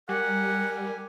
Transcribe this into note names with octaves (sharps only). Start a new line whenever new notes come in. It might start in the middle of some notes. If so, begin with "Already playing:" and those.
G3 G4 A#4 F#5 G#5